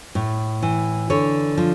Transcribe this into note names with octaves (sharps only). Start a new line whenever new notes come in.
A2
E3
D3 C#5
F3